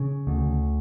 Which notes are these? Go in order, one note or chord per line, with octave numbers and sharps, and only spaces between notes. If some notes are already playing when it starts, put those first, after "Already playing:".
Already playing: C#3
D2